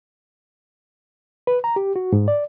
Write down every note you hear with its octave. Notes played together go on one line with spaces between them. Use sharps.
B4
A#5
G4
F#4
G#2
D5